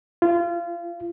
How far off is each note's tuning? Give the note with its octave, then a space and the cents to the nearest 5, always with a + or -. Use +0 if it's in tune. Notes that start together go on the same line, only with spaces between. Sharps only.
F4 -25